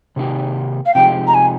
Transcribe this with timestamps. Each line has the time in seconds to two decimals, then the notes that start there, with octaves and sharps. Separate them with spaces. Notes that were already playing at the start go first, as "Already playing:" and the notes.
0.16 C3 D#3 A#3 D#4 G4
0.86 F5
0.94 C3 F3 G#3 D#4 G4 G5
1.27 A#5
1.34 G#5